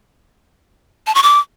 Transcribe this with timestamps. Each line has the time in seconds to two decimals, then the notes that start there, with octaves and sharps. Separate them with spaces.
1.07 A5
1.15 C#6
1.23 D6